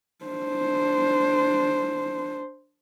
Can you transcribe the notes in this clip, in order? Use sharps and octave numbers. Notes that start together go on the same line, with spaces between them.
D4 C5